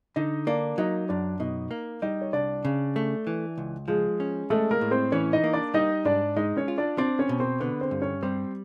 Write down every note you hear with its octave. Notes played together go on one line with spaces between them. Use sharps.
D3 D#4 D#5
A#3 D4 D5
F#3 D#4 D#5
F#2 D4 D5
B2 D#4 D#5
A#3
G3 D#4 D#5
C#5
C2 D4 D5
C#3
A3
E3
C#2
F3 G#3 G#4
C#4
G#3 A3 A4
A#3 A#4
A2
C4 C5
E3 C#4 C#5
D#4 D#5
A#3
D4 D5
G3 D#4 D#5
G#2 D4 D5
G#3 D#4 D#5
C#4 C#5
F4
D4 D5
C4 D4 D5
C#4 C#5
B2
C4 C5
D3 B3 B4
C4 C5
G2
C#4 C#5
G3 C4 C5